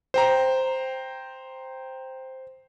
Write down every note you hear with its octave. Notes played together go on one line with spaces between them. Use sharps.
C5 G5 A#5